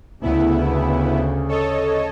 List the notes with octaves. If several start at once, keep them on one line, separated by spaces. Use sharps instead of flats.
D2 C#3 B3 E4
A4 C#5 D#5